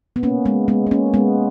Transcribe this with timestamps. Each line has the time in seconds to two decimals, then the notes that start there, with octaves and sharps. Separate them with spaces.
0.16 B3
0.23 A#3 C#4
0.45 G#3 B3
0.68 G#3 B3
0.87 B3
0.91 A#3 C#4
1.14 G#3 B3